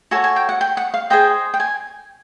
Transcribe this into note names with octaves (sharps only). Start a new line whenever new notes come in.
F#4 A4 C#5 G#5
G#5
G5
F#5
G5
F#5
F5
G#4 C5 D#5 G5
G5
G#5